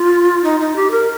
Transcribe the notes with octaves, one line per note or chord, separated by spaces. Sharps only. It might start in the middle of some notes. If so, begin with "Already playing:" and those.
Already playing: F4
D#4
D#4
G4
A#4